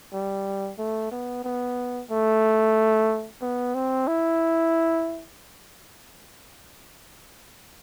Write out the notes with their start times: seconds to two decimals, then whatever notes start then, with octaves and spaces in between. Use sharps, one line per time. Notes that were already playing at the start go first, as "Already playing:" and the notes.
0.13 G3
0.78 A3
1.11 B3
1.44 B3
2.10 A3
3.41 B3
3.74 C4
4.07 E4